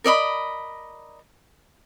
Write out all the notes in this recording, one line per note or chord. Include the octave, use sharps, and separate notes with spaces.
A#4 D5 D#5 B5